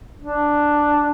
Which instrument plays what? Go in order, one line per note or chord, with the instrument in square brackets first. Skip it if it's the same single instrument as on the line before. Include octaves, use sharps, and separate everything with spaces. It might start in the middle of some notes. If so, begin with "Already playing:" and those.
[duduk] D4